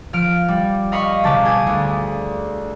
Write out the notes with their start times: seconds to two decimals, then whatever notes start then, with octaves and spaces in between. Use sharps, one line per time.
0.13 F3 F6 D7
0.48 G3
0.92 D#5 F5 B5 C#6
1.23 B1 C#3 A5 D6 B6
1.45 G#4 C5 D5 G#5
1.67 D2